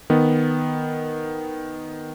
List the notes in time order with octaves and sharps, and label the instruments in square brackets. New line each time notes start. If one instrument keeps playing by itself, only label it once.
[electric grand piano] D#3 B3